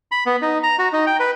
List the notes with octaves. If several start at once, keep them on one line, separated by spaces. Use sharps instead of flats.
B5
B3
D#4
A#5
F#4
D#4
G5
B4